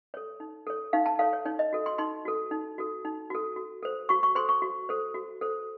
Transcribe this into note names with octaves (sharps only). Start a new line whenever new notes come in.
A4 C#5
D#4
A4 C#5
D#4 F5
A5
A4 C#5 F5
C#5
D#4 C#5
D#5
F#4 A4
C6
D#4 C6
F#4 A4
D#4
F#4 A4
D#4
F#4 A4
F#4
A4 C5
F#4 C#6
C#6
A4 C5 C6
C#6
F#4
A4 C5
F#4
A4 C5